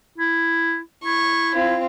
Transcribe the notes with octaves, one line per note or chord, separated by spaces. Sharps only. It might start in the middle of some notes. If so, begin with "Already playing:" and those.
E4
E4 C#6
C4 F4